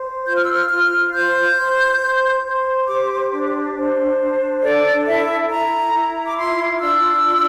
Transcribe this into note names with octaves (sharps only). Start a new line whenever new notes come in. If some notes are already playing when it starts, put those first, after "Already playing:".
Already playing: C5
F4 G6
F6
E6
F6
F4 F6
C5 G6
C5
C5
C5
G4 D6
D4
C5
D4
A4 D5
E4 E5
E4 A#5
E4
D6
F4 C6
D4 E6
F4